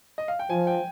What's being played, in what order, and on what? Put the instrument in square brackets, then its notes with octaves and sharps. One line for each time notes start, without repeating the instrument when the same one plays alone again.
[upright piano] D#5
F5
G5
[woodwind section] F3 [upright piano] G#5
[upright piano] G5